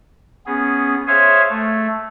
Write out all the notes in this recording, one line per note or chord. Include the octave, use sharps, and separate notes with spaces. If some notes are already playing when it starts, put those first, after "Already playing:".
B3 C#4 G#4
G#4 C5 C#5 E5 F5 G#5
A3